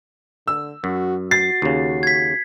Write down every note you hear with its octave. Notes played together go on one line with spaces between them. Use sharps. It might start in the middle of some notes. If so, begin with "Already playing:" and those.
D3 E6
F#2 F#4
F#4 A6 C7
D#2 C#3
G#6 B6